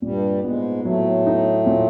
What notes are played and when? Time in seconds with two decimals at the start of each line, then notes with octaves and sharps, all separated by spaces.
0.02 G2 A#2 G3
0.44 G#2 G#3 B3
0.84 A2 F#3 A3
1.27 D#4
1.66 A#2